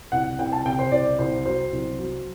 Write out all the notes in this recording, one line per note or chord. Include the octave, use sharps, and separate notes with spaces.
C2 F#5
C2 G5
A5
C3 G5
C5
C2 D5
C2 C5
F#3 C5
C2
F#3